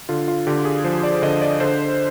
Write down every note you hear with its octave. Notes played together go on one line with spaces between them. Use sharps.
D3 F4
F4
D3 G4
G#4
F3 C5
D5
D3 D#5
D5
D3 C5